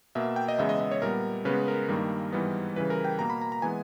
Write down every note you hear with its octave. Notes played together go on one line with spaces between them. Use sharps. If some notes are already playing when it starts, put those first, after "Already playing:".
B2 A#3 E5
G5
D#5
E2 C#3 G#3 B3 E5
D#5
D#5
C#5
A#2 G3 B3 A#4
C#3 G#3 B3 B4
A#4
G2 D#3 G3 A#3
G#2 E3 G3 B3
C#3 E3 G3 B4
A#4
G5
B2 A#3 A#5
B5
A#5
A#5
E3 G#3 B3 G#5